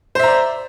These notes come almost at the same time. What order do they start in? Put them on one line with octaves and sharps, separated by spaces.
C5 E5 A#5 D5